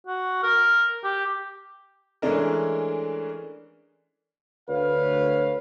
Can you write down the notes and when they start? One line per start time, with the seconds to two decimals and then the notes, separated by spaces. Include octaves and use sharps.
0.07 F#4
0.43 A#4
1.04 G4
2.22 E3 G#3 A3 C#4 D4 A#4
4.69 D2 B4 C#5 F5